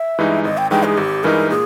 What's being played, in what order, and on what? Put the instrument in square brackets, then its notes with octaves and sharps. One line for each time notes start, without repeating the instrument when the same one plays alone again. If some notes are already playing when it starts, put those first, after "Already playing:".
Already playing: [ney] E5
[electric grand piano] G2 E3 G#3 D#4
[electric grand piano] G#1 [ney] D#5
[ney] G5
[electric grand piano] G2 E3 G#3 D#4 [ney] G5
[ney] G#4
[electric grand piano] G#1 [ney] G4
[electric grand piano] G2 E3 G#3 D#4 [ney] A#4
[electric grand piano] A#2 [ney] G#4